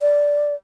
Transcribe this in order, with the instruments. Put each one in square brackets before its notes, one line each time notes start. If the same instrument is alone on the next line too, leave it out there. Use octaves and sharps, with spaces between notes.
[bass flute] D5